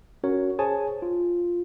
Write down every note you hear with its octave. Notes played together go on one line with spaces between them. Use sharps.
C#4 F#4 A#4 C#5
G#4 C5 C#5 G#5 A5
F4